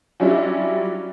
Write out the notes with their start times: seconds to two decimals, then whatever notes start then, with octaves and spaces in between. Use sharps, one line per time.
0.20 F#3 G3 C#4 D4 E4 F4